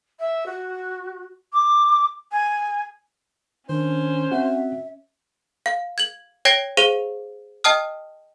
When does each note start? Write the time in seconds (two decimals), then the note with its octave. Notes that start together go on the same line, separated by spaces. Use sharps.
0.19 E5
0.46 F#4
1.53 D6
2.32 G#5
3.69 D#3 C#4 D4 C5
4.31 C4 F#4 E5 F#5
5.66 F5
5.98 G#6 F#7
6.45 C#5 G5 G#6 A#6 D7 G7
6.77 G#4 C5 F5 D#7 F7
7.64 D#5 G5 A5 D#6 F6